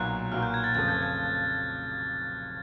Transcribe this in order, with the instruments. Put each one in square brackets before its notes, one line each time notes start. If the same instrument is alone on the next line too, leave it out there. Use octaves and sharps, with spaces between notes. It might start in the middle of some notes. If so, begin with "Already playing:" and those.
Already playing: [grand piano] B1 A#2 F#3 A#3 [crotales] F#6
[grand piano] B1 A#2 F#3 A#3 [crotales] F6
[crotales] G6
G#6
A6
[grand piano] F1 F2 C#3 F3 A3 [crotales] A6
[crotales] G6
G#6